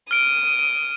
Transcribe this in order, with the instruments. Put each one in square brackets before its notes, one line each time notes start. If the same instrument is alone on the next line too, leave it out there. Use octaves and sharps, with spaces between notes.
[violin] D#6 [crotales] F6 D7